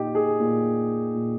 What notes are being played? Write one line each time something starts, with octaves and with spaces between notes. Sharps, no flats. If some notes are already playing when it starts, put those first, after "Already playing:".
Already playing: A#2 D#4 G4
G#4
A#2
A#2